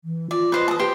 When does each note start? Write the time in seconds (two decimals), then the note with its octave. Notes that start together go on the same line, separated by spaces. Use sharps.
0.04 E3
0.31 F4 D5
0.52 B4 C5 D#5
0.68 A5 D#6
0.79 G4 B4 C5